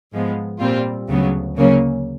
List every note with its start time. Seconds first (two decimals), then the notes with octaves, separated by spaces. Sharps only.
0.13 G#2 F3 G#3 B3
0.60 A#2 G3 C4 F4
1.09 D2 C#3 F#3 B3
1.56 C#3 F#3 A#3 C#4